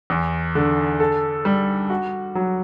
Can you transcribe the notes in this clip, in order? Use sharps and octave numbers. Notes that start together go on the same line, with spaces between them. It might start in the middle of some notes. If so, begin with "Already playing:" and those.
E2
D3
A4
G3
F#4
F#3